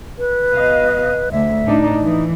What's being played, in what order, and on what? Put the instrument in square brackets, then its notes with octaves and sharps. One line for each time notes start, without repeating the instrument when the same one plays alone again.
[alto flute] B4
[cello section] B2 D#5 F5
[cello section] D2 [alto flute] E5
[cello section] A2 D4 D#4
[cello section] E3 [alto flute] D#4